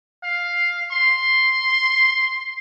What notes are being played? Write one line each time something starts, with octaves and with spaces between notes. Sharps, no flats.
F5
C6